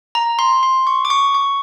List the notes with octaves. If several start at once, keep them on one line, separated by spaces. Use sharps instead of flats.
A#5
C6
C6
C#6
D6
C#6
C#6